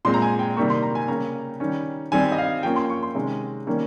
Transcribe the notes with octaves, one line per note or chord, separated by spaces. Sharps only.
A#2 G#3 C4 C6
A#5
G#5
G5
C3 D#3 G3 A#3 C#6
C6
A#5
G#5
C#3 G3 A#3 C#4 A#5
D#3 G3 C#4
D#3 G3 C4 G#5
D#5
F5
F3 A#3 C#4 G5
C6
C#6
C6
C3 D#3 G#3 C#4
D#3 G3 A#3 C#4